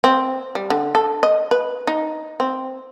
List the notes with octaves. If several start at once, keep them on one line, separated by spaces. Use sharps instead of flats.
C4
G3
D3
A4
D#5
B4
D#4
C4